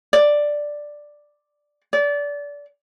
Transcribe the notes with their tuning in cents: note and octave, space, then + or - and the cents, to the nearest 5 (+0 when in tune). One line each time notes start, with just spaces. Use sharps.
D5 +5
D5 -25